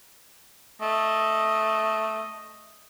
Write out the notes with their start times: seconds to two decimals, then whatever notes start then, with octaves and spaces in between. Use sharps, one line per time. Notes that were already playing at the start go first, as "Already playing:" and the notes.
0.81 A3 D#5